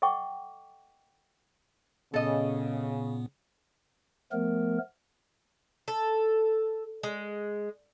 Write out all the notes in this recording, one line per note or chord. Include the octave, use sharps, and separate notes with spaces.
A4 D#5 F#5 G5 C#6 D6
A#2 C#3 B3 A4 D#5
F3 A3 B3 A#4
A4
G#3